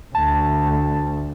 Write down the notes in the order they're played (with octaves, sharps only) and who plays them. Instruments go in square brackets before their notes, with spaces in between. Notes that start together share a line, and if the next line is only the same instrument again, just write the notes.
[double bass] D2 [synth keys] A5